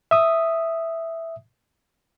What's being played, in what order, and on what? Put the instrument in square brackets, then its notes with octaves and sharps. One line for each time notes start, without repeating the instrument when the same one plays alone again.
[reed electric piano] E5 D#6